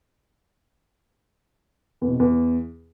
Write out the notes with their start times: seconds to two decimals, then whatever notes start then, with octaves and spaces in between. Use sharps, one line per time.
2.01 E2
2.08 B2
2.14 C3
2.20 E2